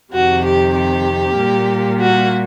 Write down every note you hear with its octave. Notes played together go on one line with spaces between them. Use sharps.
F2 C3 D#3 F#4
G4
G4
A#2 G3 A#3
F#4